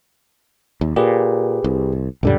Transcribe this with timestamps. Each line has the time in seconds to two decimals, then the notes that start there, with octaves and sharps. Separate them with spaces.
0.81 D#2
0.96 A#2 G4 G#4 B4
1.64 C2
2.23 C#2 F#2 A#2 D3 G3